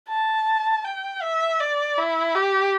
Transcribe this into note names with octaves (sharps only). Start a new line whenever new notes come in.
A5
G5
E5
D5
E4
G4